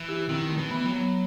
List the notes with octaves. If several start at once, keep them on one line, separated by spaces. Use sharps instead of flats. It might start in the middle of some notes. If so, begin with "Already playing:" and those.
Already playing: E3
E4 G4
D#3 C4 E4
A3 C4
E3
B3
F#3
B3